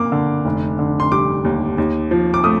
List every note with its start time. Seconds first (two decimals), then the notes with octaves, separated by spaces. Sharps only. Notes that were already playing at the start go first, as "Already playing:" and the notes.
Already playing: A#3 D6
0.12 D3
0.45 F1
0.79 D3
1.00 C6
1.12 G3 D6
1.45 D#2
1.78 D#2
2.11 F3
2.34 D6
2.44 A3 D#6